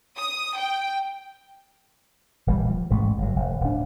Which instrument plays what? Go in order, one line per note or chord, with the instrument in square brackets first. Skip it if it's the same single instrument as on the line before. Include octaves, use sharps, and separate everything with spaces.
[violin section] D#6
G5
[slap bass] D1 A#1 E3 G3
F3
A1 G#2 G#3 A3
G1 F#3
F1
D1 D4